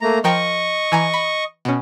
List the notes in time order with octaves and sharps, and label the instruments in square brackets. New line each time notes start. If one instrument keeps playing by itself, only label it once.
[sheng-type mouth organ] A3 A#3 A#5
[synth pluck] F3 A#4 G5 [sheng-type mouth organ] D#5 C#6
[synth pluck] E3 G#5 A#5
B5
B2 C#4